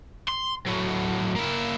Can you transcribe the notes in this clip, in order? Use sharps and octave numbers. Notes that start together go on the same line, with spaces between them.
C6
A2 F#3
A#3 E4